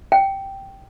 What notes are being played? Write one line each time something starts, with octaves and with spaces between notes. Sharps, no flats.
G5